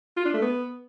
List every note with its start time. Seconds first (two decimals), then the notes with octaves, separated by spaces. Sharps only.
0.17 F4
0.25 D4
0.34 A3
0.42 B3